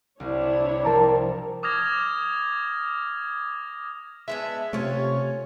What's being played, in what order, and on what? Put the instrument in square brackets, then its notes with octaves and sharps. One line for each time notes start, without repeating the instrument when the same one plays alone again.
[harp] C2 [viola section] D4 E4 C#5
[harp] F3 C4 [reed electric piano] A#4 A5 A#5
[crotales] D6 D#6 F6 G#6 A#6 F7
[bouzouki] G#3 B3 D4 [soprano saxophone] E5
[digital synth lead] C3 [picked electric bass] A3 [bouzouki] C#4 F4 [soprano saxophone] C#5